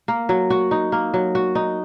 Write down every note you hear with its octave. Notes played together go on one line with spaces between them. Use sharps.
A#3
F#3
F#4
D#4
A#3
F#3
F#4
D#4